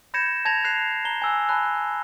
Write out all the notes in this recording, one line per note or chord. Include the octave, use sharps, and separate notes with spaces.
B5 G6 G#6 A#6 C#7 E7
A5 G#6 A#6 F7
F#6 G#6 C7 F7
A#5 G7
G#5 E6 F#6
G#5 A5 B5 F#6